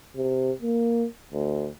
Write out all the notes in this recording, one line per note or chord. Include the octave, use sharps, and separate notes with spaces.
C3
A#3
D2